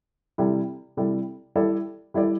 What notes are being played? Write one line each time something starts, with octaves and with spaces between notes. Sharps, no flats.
C3 G3 E4 A4
C3 G3 E4 A4
G3 E4 A4 D5
G3 E4 A4 D5